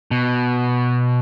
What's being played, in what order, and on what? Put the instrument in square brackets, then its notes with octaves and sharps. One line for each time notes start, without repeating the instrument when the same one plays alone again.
[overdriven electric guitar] B2